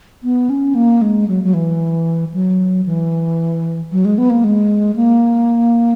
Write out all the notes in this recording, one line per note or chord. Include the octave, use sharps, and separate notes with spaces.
B3
C#4
A#3
G#3
F#3
F#3
E3
F#3
E3
F#3
G#3
B3
A#3
G#3
A#3